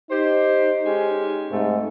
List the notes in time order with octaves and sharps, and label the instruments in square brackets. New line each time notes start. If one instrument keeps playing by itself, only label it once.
[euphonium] D#4 [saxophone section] G4 C5
[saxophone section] G#3 C#4 G4
[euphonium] G#2 [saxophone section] C3 A3